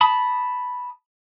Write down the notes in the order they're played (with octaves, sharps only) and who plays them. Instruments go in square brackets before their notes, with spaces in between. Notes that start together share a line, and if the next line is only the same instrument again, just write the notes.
[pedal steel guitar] A5 B5 D#6